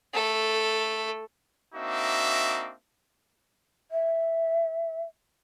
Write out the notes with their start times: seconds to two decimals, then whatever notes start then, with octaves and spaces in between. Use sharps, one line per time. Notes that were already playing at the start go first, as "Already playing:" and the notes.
0.14 A3 A4
1.75 A#3 C4 D4 D#4 F#4 E5
3.91 E5